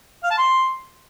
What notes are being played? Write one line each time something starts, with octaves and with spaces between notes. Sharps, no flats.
F5
A5
C6